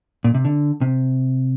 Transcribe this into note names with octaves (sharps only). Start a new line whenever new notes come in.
A#2
C3
D3
C3